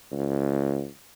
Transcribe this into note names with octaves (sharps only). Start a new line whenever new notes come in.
C#2